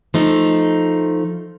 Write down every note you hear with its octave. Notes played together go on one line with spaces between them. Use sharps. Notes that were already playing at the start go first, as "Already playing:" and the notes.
F3 A3 D#4